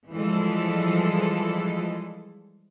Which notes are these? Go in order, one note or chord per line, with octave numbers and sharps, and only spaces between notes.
E3 F3 G3 G#3 A4